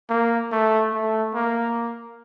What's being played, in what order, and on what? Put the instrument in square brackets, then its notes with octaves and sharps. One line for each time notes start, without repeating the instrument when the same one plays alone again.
[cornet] A#3
A3
A3
A#3